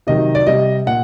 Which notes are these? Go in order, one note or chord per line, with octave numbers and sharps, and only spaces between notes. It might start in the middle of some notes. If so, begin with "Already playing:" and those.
C3 D#3 F#3 D#5
D5
C3 G3 D#5
A#2 F#5